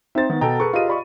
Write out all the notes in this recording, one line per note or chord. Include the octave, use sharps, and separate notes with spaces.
C4 D#4 C5 E5 A6
D#3 B3
B2 A4 G5 A#5
G#4 A#4 B4 C#6
F4 G4 D#5 F5 D#7
D5 B5 C#6